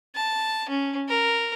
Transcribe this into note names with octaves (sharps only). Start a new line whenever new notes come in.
A5
C#4
A#4